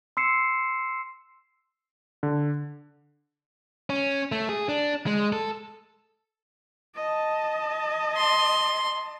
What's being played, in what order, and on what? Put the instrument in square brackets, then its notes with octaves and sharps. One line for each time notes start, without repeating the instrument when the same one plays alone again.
[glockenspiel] C6 E6 C7 C#7 E7
[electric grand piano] D3
[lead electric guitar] C#4
A3
G#4
D4
G#3
A4
[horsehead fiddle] D#5 A5
[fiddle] C6